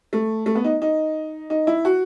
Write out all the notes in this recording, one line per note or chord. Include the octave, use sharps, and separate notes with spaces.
A3
A3
B3
D#4
D#4
D#4
E4
F#4